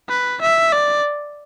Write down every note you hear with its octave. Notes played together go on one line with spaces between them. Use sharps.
B4
E5
D5